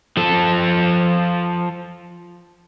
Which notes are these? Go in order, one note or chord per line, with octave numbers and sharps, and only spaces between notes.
F3 A4